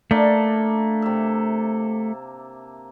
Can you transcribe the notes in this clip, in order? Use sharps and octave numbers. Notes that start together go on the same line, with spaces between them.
A3 A#3 D4 D5
C3 E5